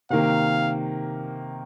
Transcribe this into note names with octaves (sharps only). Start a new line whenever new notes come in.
C3 D#3 A#3 F5